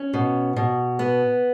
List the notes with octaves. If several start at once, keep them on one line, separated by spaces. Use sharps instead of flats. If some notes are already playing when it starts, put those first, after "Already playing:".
Already playing: C#4
B2
B2
B3